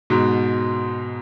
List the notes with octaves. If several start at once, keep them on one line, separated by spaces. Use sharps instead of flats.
G#2 B2